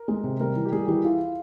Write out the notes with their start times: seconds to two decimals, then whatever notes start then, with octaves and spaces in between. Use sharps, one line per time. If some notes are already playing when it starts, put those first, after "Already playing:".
Already playing: A#4
0.08 G#3
0.24 C3
0.40 G3 A#4
0.56 E3
0.65 G4
0.72 G3 G#4
0.88 E3 G4
1.04 E4 F4